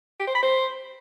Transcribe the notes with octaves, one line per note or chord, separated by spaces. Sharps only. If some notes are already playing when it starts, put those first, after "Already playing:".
G4
C5
B5
C5